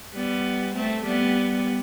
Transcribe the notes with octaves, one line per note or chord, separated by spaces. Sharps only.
G3 B3
A3 C4
G3 B3